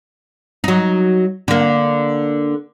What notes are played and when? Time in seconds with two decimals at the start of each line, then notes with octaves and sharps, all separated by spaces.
0.64 F#3 D#4
1.48 D3 A#3